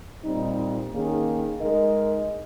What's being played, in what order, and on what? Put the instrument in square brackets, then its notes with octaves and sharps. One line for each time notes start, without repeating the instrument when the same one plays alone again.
[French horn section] A#2 G3 C4 D#4
D#3 A#3 C#4 G#4
G#3 D#4 A#4 D#5